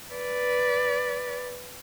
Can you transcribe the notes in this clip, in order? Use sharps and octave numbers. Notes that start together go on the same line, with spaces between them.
B4 D5